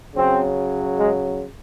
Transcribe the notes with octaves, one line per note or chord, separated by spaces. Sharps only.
C#3 F#3 C4
G#3